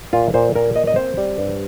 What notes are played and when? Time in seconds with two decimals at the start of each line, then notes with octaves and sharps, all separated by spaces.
0.13 A#2 F4
0.34 A#2 C5
0.55 A#2 A#4
0.75 A#3 D#5
0.87 D#5
0.96 C4 C5
1.18 G3
1.38 G2